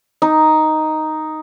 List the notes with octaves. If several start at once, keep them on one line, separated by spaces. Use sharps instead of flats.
D#4